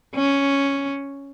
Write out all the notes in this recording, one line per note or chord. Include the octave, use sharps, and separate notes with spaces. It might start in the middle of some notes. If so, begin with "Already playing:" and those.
C#4